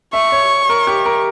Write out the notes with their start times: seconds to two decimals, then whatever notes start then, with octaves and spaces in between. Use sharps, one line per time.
0.13 E5 C#6
0.32 C#5
0.69 A#4
0.87 G4
1.06 A#4